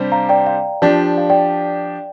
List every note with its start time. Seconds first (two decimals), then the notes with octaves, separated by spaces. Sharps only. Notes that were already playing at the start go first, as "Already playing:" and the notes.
Already playing: C3 G3 D4 G4 C5
0.12 F5 A#5
0.29 D5 G5
0.47 F5
0.82 F3 D4 G4 D5
1.18 F5
1.30 D5 G5